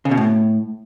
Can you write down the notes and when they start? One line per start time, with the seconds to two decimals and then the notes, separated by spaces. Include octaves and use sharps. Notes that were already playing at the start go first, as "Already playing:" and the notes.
0.05 C#3
0.11 B2
0.17 A2